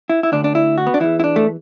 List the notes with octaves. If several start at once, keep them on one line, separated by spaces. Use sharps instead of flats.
E4
E4
D2 D3 D4
D4
E4
F#4
B3
D4
E2 E3 E4
E4
D4
A3